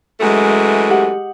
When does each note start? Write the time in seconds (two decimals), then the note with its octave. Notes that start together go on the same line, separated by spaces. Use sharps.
0.20 F#2 E3 G#3 A3
0.91 G4 F#5